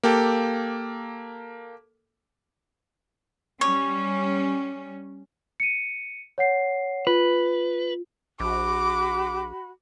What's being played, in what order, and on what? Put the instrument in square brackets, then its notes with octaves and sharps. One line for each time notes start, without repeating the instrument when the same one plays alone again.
[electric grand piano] A#3 G4 A4
[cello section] G3 C#4 [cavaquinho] C#5
[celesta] C#7 D#7
C#5 F#5 C7
[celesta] F4 [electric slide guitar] B4
[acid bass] A#1 [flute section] F#4 B5 [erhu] D6